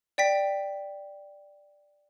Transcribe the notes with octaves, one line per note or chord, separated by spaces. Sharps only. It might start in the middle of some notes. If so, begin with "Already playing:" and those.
D5 G5 B6